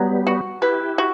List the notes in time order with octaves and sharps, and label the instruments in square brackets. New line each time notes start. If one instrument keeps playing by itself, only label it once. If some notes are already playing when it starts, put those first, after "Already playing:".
Already playing: [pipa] F#3 [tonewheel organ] G3 B3
[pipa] F#4
[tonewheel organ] E4 G4 [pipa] B4
[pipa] F#4